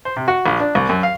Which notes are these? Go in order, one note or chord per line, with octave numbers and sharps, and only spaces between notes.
C5
C3
F#4
A#1
D4
C2
F#2
F5